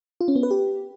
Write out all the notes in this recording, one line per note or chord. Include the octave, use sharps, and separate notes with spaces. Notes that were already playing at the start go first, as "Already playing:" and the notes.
F4
C#4
B3
B4
G4